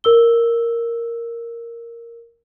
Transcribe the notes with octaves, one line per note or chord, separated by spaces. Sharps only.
A#4 E6 G7